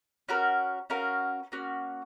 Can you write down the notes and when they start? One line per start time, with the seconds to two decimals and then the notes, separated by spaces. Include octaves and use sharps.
0.29 C#4 F#4 A#4
0.90 C#4 F#4 A#4 F5
1.52 A#3 C#4 F#4